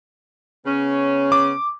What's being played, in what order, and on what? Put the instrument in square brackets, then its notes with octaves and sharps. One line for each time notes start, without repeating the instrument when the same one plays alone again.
[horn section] C#3 B3 C#4
[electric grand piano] D6